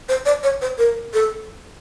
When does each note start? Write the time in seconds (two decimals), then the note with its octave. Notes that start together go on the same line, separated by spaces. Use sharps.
0.09 C5
0.26 D5
0.43 C#5
0.62 C5
0.78 A#4
1.14 A4